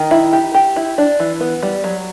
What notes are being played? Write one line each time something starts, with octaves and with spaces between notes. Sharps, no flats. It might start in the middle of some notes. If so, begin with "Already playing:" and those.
Already playing: D#3
E4
G4
G4
E4
D4
E3
B3
G3
F#3